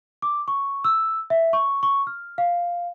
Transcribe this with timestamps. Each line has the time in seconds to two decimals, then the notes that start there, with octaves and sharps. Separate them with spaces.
0.22 D6
0.48 C#6
0.84 E6
1.30 E5
1.53 C#6
1.83 C#6
2.07 F6
2.38 F5